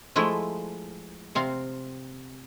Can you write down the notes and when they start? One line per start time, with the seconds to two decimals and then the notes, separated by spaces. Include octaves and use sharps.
0.16 F3 G#3 A3 E4
1.35 C3 C4 F5